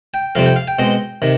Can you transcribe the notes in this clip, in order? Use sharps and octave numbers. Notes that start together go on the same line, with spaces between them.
G5
F2 C3 G3 C4 F5
G5
F5
G5
B2 G#3 C4
C3 D#3